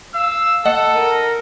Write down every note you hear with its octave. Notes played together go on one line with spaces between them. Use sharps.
F5 E6
A4 D#5 F#5
D#4 A#4